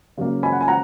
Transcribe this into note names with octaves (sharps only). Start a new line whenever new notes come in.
C#3 F#3 A#3
G#5 B5
F#5
G#5
F#5 A#5